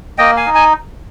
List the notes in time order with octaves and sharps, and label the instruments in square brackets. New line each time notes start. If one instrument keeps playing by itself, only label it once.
[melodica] A#3 D#5 G5
F5 G#5
D#4
G#5